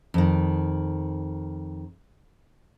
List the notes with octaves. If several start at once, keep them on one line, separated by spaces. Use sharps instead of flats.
F2 D#3